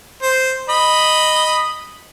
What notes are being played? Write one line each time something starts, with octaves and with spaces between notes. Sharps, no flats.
C5
D#5 B5